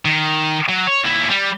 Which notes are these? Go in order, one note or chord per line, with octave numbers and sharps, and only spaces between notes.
D#3
F#3
C#5
D#2 E4
G3